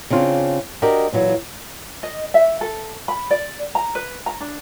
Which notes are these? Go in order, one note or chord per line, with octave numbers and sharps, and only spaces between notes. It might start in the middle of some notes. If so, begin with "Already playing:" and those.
C#3 C4 D4 F4
D4 F#4 G4 A#4 D#5
A#2 E3 F#3
D#5
E5
A4
B5
D5
A#5
B4
A#5
D4